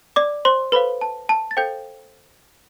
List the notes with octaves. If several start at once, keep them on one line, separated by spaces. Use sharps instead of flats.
D5 D6
C5 C6
A4 B4 C5 F5 B5
A5
A5
A6
A4 C5 F5 G5 G6